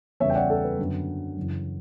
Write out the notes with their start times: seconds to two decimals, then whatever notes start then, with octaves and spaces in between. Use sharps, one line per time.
0.20 E2 C#3 G3 B3 C#5 E5
0.30 G5
0.35 D5 F#5
0.50 A4
0.64 B4
0.78 F#2 D3 F#3 B3
1.37 F#2 C#3 E3